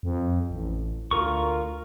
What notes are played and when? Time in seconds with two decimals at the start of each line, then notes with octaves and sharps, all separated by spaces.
0.03 F2
0.51 A1
1.11 D2 F4 A#4 C#6